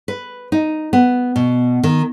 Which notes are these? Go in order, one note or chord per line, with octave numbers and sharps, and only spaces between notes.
B4
D#4
B3
B2
D#3